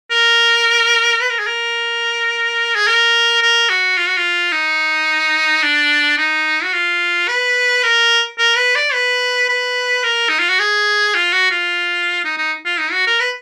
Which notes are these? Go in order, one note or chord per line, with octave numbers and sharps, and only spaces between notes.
A#4
B4
A#4
G#4
A#4
G#4
A#4
A#4
F#4
F4
F#4
F4
D#4
D4
D#4
F#4
F4
B4
A#4
A#4
B4
D5
B4
B4
A#4
D#4
F4
F#4
G#4
F4
F#4
F4
D#4
D#4
F4
D#4
F#4
A#4
B4